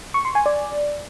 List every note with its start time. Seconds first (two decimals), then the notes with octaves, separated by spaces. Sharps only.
0.14 C#6
0.25 C6
0.35 G#5
0.46 D5